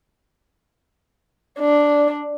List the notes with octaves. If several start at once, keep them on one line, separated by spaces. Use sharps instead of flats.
D4